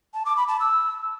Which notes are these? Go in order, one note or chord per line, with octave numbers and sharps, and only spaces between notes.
A5
D6
B5
A5
E6